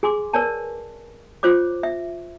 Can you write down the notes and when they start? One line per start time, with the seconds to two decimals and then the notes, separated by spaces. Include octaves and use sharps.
0.03 G#4 G#5 C6 D6
0.33 A#4 B4 C#5 D5 G#5 A5
1.43 F4 C5 C#5 D6
1.83 E5